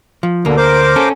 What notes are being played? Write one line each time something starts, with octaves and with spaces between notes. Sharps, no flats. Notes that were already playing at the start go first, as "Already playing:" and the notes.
F3
D2 B2 D3 A#3
A#4 C5 D6
C#4 A4